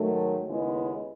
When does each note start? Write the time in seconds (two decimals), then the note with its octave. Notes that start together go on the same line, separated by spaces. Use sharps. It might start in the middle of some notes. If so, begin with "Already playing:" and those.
Already playing: G#2 D#3 F#3 A3
0.47 D#2 C#3 G#3 B3 E4